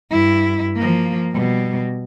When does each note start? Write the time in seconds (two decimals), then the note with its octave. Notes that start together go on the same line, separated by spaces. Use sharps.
0.12 G2 E4
0.76 F3 A#3
1.33 B2 G3